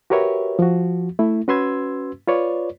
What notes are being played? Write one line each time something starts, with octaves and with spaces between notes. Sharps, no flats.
F#4 G4 A#4 B4 C#5 E5
F3 F#4
A3 E4
C#4 F#4 B4 C6 E6 G#6
F4 B4 C#5 D5